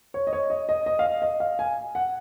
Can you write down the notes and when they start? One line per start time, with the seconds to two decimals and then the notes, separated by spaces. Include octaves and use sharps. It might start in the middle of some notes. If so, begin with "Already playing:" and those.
0.14 C#5
0.27 D#5
0.33 C#5
0.50 D#5
0.69 D#5
0.86 D#5
0.99 F5
1.04 D#5
1.22 D#5
1.40 F5
1.59 G#5
1.95 F#5